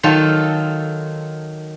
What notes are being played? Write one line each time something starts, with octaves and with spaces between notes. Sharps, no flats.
D#3 F#3 F4 A4